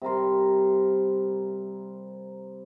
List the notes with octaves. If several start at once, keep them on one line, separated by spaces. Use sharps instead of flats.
C3 G3 A#4 C6